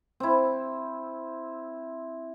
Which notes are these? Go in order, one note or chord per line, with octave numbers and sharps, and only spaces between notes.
C4 E4